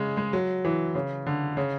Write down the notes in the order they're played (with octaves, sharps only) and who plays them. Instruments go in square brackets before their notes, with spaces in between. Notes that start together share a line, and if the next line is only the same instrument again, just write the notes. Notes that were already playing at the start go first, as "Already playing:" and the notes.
Already playing: [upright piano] C#3 G#3
G#3
F#3
E3
C#3
D3
C#3